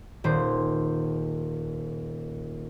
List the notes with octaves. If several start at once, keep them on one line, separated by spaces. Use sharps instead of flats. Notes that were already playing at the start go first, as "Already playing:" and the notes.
D#1 C5